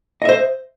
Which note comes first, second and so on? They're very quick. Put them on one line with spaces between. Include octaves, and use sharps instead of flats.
D#5 E5 C5